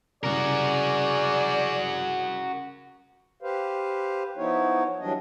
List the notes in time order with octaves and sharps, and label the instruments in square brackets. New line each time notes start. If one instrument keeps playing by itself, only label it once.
[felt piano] C2 C#3 [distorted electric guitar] F#4 A#4 [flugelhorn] G#4 [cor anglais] D5
[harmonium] G4 B4 C5 F5
F3 B3 D#4 E4 C#5
E3 F#3 G3 D4 D#5